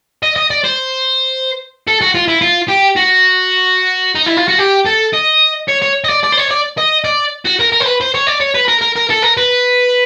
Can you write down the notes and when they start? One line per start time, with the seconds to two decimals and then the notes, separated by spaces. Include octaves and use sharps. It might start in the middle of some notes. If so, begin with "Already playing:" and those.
0.23 D#5
0.36 D#5
0.51 D5
0.64 C5
1.87 A4
2.01 F#4
2.15 F4
2.28 E4
2.41 F4
2.68 G4
2.96 F#4
4.15 D#4
4.26 E4
4.37 F4
4.48 F#4
4.59 G4
4.87 A4
5.14 D#5
5.69 C#5
5.82 C#5
6.05 D#5
6.09 D5
6.24 D5
6.32 C5
6.37 C#5
6.51 D5
6.78 D#5
7.05 D5
7.45 F#4
7.60 A#4
7.72 A#4
7.81 C5
7.86 B4
8.01 C5
8.15 C#5
8.27 D5
8.41 C#5
8.55 B4
8.68 A#4
8.82 A#4
8.96 A#4
9.10 A4
9.22 A#4
9.37 B4